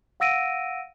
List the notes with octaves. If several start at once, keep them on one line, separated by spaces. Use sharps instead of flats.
F5 F#5 E6 A#6 D7 D#7